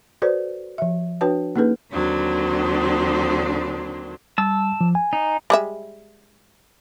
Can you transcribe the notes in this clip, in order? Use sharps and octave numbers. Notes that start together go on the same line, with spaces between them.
F#4 A4 B4 C5 D5
F3 E5
D4 F#4 B4 C#5 G5 A5
A#3 C#4 D#4 G#4 A4 B4
D#2 D3 F#3 C4 D4
G3 A5 E6
F3
G#5
D#4
G3 G#3 E5